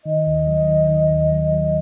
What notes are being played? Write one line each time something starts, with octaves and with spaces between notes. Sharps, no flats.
D#3 D#5
D#2
F#3
D#3
D#3
D#2
F#3
F#3